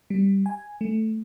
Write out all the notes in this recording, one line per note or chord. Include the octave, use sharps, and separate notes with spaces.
G3
G#5
A3